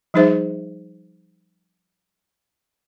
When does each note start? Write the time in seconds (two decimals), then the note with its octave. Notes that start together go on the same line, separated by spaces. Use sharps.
0.14 F3 G3 D#4 G#4 C5 E5